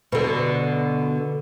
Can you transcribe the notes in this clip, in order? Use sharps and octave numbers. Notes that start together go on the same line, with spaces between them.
B2 D3